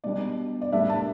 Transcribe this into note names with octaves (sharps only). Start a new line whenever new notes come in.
B2 G3 D4 D5
D5
A2 G3 D4 E5
A5